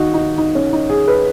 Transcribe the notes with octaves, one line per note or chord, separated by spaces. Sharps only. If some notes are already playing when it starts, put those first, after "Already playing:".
Already playing: D#2 D#4 F#4
D#4
D#4
C#4
D#4
G#4
B4